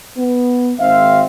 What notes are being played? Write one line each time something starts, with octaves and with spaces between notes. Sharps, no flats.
B3
G#1 C4 E5 F5